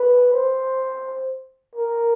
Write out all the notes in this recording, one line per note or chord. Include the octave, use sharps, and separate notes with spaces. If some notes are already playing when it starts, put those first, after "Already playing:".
Already playing: B4
C5
A#4